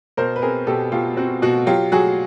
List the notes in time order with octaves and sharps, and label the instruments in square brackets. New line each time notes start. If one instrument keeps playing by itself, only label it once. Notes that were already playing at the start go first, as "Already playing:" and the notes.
[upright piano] B2 A#4 C5
B4
C4 G#4 A#4
B2 G4 A4
B2 F4 G4
C4 F#4
B2 F#4
F#3 F4 G4
F#3 F#4 G#4